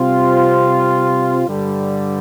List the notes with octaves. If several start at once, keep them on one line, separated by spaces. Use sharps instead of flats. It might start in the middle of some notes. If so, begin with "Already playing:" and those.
Already playing: C3 G3 C4 F4
G2 D3 G3